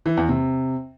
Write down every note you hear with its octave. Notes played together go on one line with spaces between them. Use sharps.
E3
E2
C3